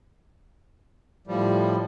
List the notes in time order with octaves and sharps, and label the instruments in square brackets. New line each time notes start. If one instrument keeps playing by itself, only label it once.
[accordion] A2 F3 G3